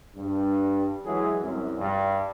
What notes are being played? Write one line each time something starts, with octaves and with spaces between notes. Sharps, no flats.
G2
E3 F#3 G#3 G#4
C2 F#2
G2